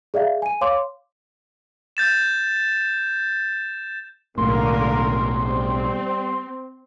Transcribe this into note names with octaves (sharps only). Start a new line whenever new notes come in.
G#4 D5 E5 F5
G#5 D#7
C#5 F5 C6 D6
G6 A6 E7
B1 A2 D3 A#3 A#4 C6
G3 C4